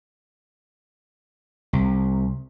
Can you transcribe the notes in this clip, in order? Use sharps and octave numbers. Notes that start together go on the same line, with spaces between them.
C2